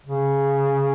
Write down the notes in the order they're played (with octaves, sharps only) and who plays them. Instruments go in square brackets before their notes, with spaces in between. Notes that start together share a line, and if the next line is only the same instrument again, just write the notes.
[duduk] C#3